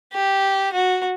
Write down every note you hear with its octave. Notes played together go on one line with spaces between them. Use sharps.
G4
F#4